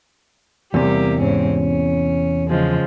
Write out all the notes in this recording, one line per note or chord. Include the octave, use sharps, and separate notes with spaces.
E2 C3 G3 A#3 G4
G#2 C4 C#4
C#4
C#3 F3 G#3